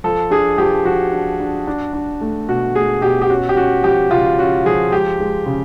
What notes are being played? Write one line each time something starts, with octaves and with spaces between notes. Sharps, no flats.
F3 A4
D4 G#4
F3 G4
F3 F#4
D4
D4
D4
D4
A3
B2 F#4
A3 G#4
B2 G4
G4
C#4 F#4
G4
C#4 F#4
F3 G4
C#3 F4
C#4 F#4
F3 G#4
G#3 G4
G#3
C#3